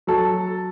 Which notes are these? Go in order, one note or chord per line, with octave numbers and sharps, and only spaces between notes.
F#3 A4